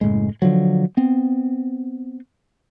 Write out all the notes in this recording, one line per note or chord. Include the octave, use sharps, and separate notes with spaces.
F#1 F2 A2 G#3
D3 F3 F#3
B3 C4